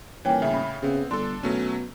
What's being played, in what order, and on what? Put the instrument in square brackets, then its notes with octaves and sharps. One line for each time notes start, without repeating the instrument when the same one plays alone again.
[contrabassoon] D#1 [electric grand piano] E3 A#3 [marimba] C#5 G5 G#5
[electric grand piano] A2 C#3 [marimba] E5
[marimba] B5
[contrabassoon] C#3 [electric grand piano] B3 C4
[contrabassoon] G1 [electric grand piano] D4 A4 [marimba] C6
[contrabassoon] B2 [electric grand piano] F#3 A3 C#4